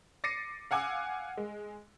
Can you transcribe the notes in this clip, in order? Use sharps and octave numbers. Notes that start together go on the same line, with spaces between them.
D6 A6 A#6 C7 C#7 D#7
F5 F#5 G#5 D6 E6 F#6
G#3